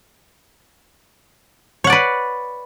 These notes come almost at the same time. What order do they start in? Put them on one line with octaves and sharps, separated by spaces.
C#5 F#5 D5 B4